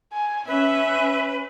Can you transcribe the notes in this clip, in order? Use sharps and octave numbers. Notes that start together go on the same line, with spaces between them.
G#5
C#4 B4 E5